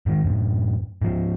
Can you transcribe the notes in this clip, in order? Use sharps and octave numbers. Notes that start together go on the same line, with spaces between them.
G#2 D#3 G#3
F#2 A2
G#2 F3